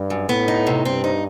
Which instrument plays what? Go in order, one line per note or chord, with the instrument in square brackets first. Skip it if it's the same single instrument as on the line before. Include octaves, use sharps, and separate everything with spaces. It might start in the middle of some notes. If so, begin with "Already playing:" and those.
Already playing: [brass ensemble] G2
[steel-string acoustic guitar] F#2
[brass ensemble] A2 [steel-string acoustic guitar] B3
[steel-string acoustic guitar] D#4
C3
[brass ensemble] G2 [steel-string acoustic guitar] C4
[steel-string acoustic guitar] D#4